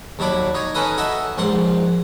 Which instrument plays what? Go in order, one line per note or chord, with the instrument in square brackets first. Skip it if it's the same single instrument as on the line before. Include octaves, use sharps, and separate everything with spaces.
[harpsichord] D#2 F#3 D4 B5 D6
D#4 C#5
C#4 D#4 A4 B4 D#5
F#4 A4 D#5 E5
A#1 G#2 F#5 C6